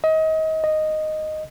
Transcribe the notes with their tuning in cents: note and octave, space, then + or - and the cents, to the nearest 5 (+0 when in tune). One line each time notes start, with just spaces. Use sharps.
D#5 +30
D#5 -5